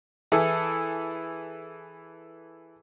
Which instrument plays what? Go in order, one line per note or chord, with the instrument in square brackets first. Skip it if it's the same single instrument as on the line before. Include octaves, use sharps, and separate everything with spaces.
[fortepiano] E3 E4 G#4 A4